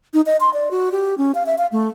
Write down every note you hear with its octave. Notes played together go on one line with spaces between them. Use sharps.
D#4
D#5
C6
D5
F#4
G4
C#4
F5
E5
F5
A3